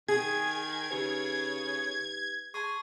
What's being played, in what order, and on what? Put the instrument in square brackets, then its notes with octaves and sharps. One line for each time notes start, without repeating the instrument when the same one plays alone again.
[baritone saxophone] D#3 [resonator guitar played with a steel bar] G#4 [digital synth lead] G#6
[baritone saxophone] C#3 [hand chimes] D#4 G4 B4
[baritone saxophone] G#4 [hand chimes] A5 C6 C#6